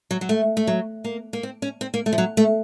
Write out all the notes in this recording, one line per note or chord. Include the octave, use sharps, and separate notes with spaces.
F#3
F#3
A3
A3
F#3
A#3
A#3
C4
C#4
C4
A#3
A3
F3
F#3
A3